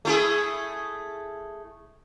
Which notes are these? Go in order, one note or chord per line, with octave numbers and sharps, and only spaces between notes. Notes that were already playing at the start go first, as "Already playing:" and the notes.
A3 E4 G#4